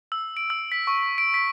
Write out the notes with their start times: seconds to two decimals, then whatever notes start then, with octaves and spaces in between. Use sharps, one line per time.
0.12 E6
0.37 D7
0.50 E6
0.72 B6
0.87 C#6
1.18 D7
1.34 B6